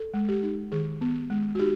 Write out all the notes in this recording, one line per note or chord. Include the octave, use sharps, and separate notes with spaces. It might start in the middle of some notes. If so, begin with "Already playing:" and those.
Already playing: A4
G#3
G4
D#4
D#3 G#4
B3
G#3
F#4
D#4 G4